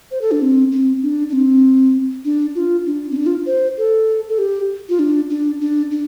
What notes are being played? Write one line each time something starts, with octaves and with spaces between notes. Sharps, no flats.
C5
A4
D4
C4
C4
D4
D4
C4
D4
F4
D4
C4
D4
F4
C5
A4
A4
G4
F4
D4
D4
D4
D4